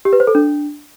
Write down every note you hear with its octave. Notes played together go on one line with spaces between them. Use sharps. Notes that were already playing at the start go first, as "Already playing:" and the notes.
G4
B4
C5
A4
D4